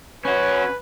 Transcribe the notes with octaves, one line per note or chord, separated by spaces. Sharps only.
C#4 F#4 B4 C#5